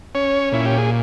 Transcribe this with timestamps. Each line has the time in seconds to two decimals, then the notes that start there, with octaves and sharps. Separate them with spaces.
0.15 C#4 C#5
0.52 A#2 E4
0.66 G4
0.78 G#4